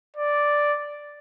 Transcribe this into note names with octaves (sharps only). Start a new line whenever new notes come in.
D5